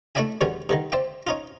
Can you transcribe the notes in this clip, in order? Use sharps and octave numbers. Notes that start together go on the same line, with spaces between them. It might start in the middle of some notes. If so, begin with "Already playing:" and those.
A3 D4 E4 D5 E5 G#5
E2 B2 D3 G3 C#4
G2 D3 D#3
C5 D5 E5 G5
C#4 D#4 F4